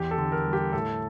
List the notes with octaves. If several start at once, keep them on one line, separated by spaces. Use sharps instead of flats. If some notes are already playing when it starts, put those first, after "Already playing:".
Already playing: E2 G4
A4
D3
A#4
G3
G4
A2 A4